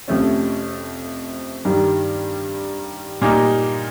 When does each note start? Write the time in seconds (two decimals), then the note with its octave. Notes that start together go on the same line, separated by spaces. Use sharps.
0.08 F2 C3 F3 A3 C#4
1.65 G2 D#3 G3
3.21 A#2 G3 A#3 D#4